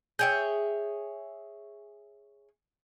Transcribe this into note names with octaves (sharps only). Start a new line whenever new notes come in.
G#4 C#5 E5 G5 G6